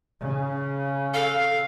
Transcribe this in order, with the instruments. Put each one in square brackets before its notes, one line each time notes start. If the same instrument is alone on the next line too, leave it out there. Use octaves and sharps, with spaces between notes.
[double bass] C#3
[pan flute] A4 [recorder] F5